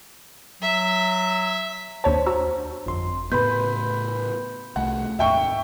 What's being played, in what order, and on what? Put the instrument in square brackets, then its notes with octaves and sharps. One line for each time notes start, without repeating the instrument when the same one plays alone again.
[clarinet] F#3 [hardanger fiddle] E5
[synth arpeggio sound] D#2 C#5 A5 [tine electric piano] D4 C5
[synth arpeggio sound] F#4 A#5 E6
[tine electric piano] G1 F2 C6
[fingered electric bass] A2 C#3 B3 [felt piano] B4 [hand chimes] B5 C6 G6
[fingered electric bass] C2 A3 [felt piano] F#5
[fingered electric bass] D#2 G#2 [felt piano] E5 G5 C#6